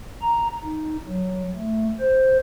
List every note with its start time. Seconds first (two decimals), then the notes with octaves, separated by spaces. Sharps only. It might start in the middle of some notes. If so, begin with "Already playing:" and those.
0.21 A#5
0.63 D#4
1.08 F#3
1.56 A3
2.00 C5